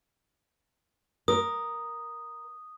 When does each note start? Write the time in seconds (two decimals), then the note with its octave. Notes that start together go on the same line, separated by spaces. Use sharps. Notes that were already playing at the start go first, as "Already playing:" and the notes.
1.28 A#4 D#6